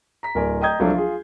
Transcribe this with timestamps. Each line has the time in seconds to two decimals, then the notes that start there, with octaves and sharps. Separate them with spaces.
0.23 A#5 B6
0.35 D1 A#4 D5 G#5
0.61 D#5 G5 A#5 D#6 G6 G#6
0.80 C2 F3 F#3 D4 A4
0.94 F4 G#4